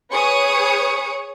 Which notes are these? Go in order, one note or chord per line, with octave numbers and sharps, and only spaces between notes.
G#4 B4 C#5 C#6 D#6 C#7